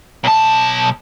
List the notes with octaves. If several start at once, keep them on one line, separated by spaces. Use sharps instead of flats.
B1 A5